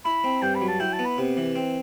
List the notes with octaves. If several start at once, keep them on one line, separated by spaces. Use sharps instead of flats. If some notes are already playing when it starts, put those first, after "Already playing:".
E4 B5
C4
G2 G5
B5
F#3
A5
E4 G5
A5
B3
B5
C3
E3
C4